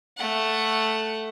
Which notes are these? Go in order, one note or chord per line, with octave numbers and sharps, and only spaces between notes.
A3 F#5